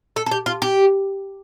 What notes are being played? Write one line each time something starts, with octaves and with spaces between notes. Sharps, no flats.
A4
A4
G4
F4
G4